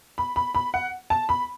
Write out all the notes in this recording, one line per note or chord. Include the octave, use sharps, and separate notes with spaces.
B5
B5
B5
F#5
A5
B5